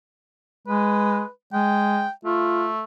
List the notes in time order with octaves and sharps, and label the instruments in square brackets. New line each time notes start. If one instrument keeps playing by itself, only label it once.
[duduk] G#3 [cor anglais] B4
[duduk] G#3 [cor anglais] G5
[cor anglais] A3 [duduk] F4